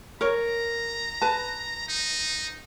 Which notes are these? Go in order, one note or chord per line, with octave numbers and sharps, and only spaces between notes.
A#4 C#5 A#5
B4 A5
D#4